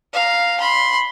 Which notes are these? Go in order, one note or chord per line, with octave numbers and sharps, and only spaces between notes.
F5 A#5
B5 C6